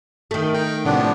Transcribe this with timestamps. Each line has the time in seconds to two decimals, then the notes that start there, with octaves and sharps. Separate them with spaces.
0.31 D#3 A3
0.54 D#4 G5
0.85 A2 C3 F3 B3 D4